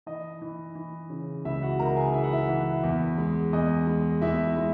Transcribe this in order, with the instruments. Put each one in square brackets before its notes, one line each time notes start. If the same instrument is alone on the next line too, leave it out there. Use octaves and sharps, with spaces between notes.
[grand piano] E3 D#5
E3
E3
C#3
C#2 E4 E5
F#4 F#5
C#2 A#4 A#5
G#4 G#5
E3 E5
F#5
E4 E5
E3
E2
G#3
E2 D#5
G#3
E2 E4 E5
G#3